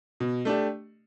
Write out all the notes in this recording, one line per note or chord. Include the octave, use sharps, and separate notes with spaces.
B2
A3 D4 G4